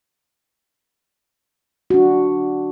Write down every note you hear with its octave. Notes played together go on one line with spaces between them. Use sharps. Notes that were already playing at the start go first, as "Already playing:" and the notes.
D4 F#4